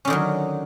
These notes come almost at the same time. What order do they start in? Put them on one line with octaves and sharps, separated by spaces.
C#4 D3 D#3 F#3